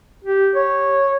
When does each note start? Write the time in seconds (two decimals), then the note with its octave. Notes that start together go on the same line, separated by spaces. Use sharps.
0.25 G4
0.55 C#5